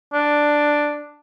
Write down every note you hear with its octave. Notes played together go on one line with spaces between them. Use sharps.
D4